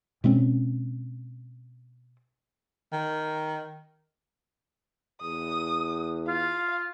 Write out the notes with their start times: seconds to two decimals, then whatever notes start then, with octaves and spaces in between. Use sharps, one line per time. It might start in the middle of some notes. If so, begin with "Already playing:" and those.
0.24 B2 G#3 C4 C#4
2.92 D#3
5.22 E2 D#6
6.28 F4 F5